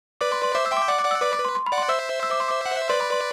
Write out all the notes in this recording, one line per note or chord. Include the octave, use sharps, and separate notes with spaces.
B4 D5 D6
C6
C6
C5 E5 D6
E6
E5 G5 C6
D6
D5 F#5 D6
D6
D5 F#5
E6
B4 D5 D6
D6
B4
C6
C6
B5
D5 F#5
C6
C5 E5 E6
E6
D6
C6
D6
F#5
E5
B4 D5 C6
B5
C6